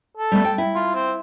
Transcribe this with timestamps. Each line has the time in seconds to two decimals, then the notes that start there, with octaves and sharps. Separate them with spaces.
0.17 A4
0.32 G3 A3 B3
0.45 G5
0.58 E4
0.75 F4
0.94 C4